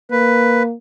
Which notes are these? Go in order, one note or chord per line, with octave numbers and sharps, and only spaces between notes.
A#3 B4